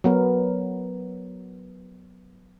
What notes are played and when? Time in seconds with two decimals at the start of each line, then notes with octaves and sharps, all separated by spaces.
0.04 F#3 B3 A#4